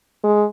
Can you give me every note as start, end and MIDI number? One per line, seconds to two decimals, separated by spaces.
0.24 0.45 56